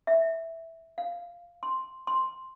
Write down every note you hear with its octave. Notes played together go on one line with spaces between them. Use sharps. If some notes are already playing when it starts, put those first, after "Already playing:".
E5
F5
C6
C6